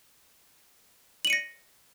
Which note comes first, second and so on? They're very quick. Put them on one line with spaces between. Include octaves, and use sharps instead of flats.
F#7 D#7 C#7 A#6